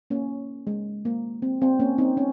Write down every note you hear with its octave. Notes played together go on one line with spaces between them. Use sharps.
A#3 C#4
G#3
A#3
C4
C4
A#3 C#4
C4 D#4
C#4